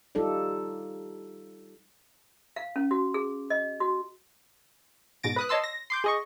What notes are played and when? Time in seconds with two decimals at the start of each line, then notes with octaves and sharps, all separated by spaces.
0.15 G3 D#4 F4 A4 D5
2.56 F5
2.76 C#4
2.91 F#4
3.14 G#4
3.50 D#5
3.80 F#4
5.23 G#2 B2 A6 A#6 D7
5.36 B4 D#6 F#6
5.49 C#5 D#5 A5 C6 E6
5.64 A#6
5.90 C6 D6 G6
6.04 G#4 D#5 C#6